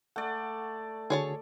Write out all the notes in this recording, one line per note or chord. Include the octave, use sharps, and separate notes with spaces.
A3 D5 F#5
D3 F#4 G#4 C#5 A5